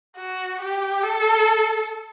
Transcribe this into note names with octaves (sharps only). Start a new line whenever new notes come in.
F#4
G4
A4